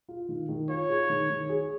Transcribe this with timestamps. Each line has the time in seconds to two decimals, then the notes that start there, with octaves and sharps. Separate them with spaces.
0.09 F4
0.29 D#3
0.49 D#3
0.69 F4 C#5
0.89 G#4
1.09 D#3
1.30 D#3
1.49 G#4